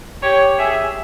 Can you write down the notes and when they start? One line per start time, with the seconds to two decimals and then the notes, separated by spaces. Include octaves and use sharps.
0.23 G4 C#5
0.59 G#4 E5